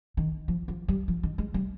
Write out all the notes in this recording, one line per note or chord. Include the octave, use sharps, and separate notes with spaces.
D#3
F3
F3
G3
F3
D#3
G#3
G3